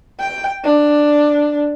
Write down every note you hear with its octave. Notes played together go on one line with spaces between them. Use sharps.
G5
D4